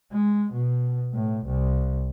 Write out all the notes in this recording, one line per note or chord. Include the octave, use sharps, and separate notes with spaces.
G#3
B2
A2
C2